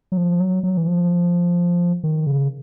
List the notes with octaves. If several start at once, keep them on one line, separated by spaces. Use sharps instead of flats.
F#3
F3
F#3
F#3
E3
F3
D#3
C#3